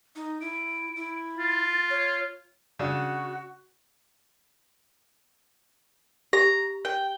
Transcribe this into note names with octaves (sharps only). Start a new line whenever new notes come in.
D#4
E4 D7
E4
F4 A6
C#5 F6
C#3 D4 F#4
G4 A#5
G5